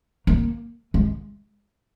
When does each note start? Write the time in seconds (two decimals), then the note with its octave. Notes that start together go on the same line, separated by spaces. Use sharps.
0.27 A#3
0.94 G#3